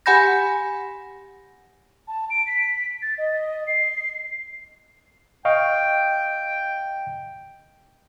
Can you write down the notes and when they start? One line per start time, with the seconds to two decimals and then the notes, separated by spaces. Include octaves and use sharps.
0.06 G4 F#5 G#5 B5 G6 A#6
2.08 A5
2.30 D7
2.47 B6
3.02 A6
3.18 D#5
3.67 C7
5.45 D#5 F5 G5 C#6